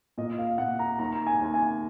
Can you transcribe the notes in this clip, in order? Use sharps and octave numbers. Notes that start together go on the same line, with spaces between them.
A#2 D#5
F5
A#2 F#5
A#5
D#2 A#5
G#5
D#2
G#5